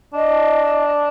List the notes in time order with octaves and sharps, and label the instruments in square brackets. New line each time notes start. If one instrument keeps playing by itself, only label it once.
[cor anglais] D4 [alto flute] D#5